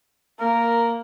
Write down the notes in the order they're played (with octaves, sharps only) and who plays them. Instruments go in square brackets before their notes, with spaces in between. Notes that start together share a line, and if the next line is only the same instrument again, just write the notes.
[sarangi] A#3 [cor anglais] A#4